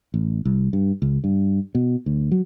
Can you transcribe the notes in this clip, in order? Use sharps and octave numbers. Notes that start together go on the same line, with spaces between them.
A1
C2
G2
C#2
G2
B2
D2
F#3